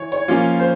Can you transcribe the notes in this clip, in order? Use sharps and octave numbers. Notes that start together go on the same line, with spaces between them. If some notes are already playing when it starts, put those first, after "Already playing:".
Already playing: E3 C#5
C#5
F3 A#3 C#4 F4
C5